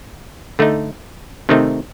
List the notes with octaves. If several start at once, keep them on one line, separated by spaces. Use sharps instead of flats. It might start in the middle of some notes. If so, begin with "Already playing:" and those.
D3 A3 D#4
C3 D#3 A3 C4 D#4